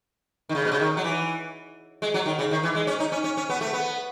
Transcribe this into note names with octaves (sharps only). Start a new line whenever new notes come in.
D#3
C#3
B2
C#3
D#3
F#3
E3
G#3
F#3
D#3
C#3
D#3
E3
G#3
C#4
D#4
C#4
C#4
C#4
B3
A3
B3